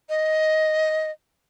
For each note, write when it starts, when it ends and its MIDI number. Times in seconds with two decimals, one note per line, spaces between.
0.09 1.11 75